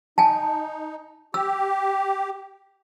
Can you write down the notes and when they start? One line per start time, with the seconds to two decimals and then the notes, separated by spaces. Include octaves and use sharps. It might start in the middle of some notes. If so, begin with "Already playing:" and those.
0.18 D#4 G#5 A5
1.34 G4 E6